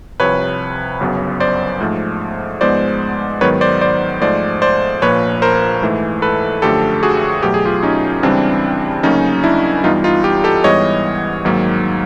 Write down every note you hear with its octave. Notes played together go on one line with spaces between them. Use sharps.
C2 C3 F3 B4 C#5
G1 F#2 C#3 F#3 B3
C5 D5
G#2 F3 A3
G#2 F3 G#3 B3 C5 D5
G#2 D#3 F#3 B3 B4 C#5
C5 D5
C5 D5
G#2 F3 A3 C5 D5
C5 D5
A#1 A#2 F3 A#3 B4 C#5
A#4 C5
G#2 E3 A3
A4 B4
F#2 D3 F3 A3 G4 A4
F#4 G#4
E2 B2 F#3 A3 G4
G#4
F4 G4
C#4 D#4
C#2 C#3 E3 G3 C4 D4
D2 C#3 F#3 A#3 C#4 D#4
D4 E4
G2 E3 G3 B3 D#4 F4
D#4 F4
F4 G4
G4 A4
G#2 E3 G3 B3 C#5 D#5
G#2 D#3 F#3 A#3